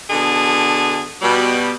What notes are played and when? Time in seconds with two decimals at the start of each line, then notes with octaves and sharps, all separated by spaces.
0.10 B2 D3 G#4 A5
1.22 B2 G3